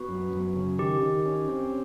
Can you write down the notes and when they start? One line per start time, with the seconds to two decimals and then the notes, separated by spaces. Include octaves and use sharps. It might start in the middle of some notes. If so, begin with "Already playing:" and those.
Already playing: B3 F#4
0.09 F#2
0.33 F#2
0.56 C#3
0.79 D#3 G4
1.02 D#3
1.26 C#4
1.48 C4